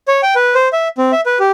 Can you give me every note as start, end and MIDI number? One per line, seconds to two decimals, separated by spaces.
0.08 0.21 73
0.23 0.34 79
0.35 0.54 71
0.55 0.68 72
0.73 0.88 76
0.98 1.12 60
1.12 1.21 76
1.26 1.38 71
1.40 1.52 67